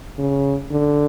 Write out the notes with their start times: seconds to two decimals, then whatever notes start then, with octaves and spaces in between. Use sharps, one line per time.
0.19 C#3
0.71 D3